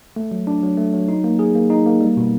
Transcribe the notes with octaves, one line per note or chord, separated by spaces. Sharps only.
A3
F#3
D4
F#3
A3
F#3
D#4
A#3
G#4
A#3
D#4
A#3
G3
B2